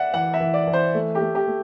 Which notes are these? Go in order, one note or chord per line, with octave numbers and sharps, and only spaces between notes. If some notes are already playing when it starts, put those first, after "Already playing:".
Already playing: D5 E5 F#5
E3 F#5
E5
E3
D5
E3
C5
A3
G4
A3
G4
A3